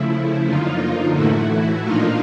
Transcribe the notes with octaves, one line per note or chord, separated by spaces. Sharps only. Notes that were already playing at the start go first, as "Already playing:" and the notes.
Already playing: C#3 F3 A3 E4
F#2 D3 F3 A#3 D#4 F4
A2 E3 A3 E4 F#4
A#2 F3 A#3 D4 D#4 F4